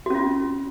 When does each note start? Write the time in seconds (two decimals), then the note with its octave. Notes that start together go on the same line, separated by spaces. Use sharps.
0.06 F#4
0.10 C#4
0.15 F4